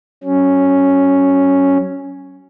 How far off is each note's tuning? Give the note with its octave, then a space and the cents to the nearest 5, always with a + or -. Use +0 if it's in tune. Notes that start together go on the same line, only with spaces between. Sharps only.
F#3 +20 C#4 +0